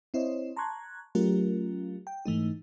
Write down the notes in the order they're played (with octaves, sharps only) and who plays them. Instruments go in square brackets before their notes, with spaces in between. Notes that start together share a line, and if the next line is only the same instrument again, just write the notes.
[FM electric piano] C4 E4 C5 C#5 D#5
A5 A#5 C6 C#6 F#6 G#6
F#3 A3 C#4 F4 G4 A#4
G5
G#2 E3 A3 D#4